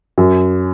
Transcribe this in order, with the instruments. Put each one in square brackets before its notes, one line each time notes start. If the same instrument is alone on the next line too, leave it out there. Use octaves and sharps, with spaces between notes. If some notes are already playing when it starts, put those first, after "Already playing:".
[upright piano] F#2